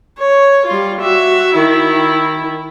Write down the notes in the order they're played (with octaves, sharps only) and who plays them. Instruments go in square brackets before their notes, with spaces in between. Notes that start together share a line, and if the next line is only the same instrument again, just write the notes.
[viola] C#5
G3 F4
F#4 E5
D#3 E4